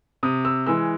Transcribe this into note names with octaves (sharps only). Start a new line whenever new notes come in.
C3 D#6
E6
E3 G#3 E6